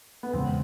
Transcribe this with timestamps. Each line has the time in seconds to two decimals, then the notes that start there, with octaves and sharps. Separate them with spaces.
0.23 B3
0.33 E2 C#3 E3 G#3 C4